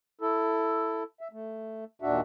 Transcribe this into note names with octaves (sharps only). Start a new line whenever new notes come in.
E4 A4
E5
A3
D#2 A#2 D4 F#4 E5